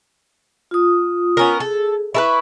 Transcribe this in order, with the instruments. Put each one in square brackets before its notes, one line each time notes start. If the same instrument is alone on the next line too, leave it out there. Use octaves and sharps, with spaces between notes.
[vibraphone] F4 D#6
[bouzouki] B3 C#4 A#4
[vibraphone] G#4 [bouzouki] A4
[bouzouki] E4 A4 B4 [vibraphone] C#6